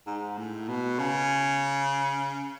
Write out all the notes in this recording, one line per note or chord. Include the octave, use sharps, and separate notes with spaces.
G#2
A2
B2
C#3